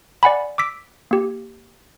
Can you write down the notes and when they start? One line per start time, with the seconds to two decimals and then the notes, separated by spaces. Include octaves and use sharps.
0.23 D5 F#5 G#5 B5
0.58 D6 E6 B6 D7
1.11 A#3 G4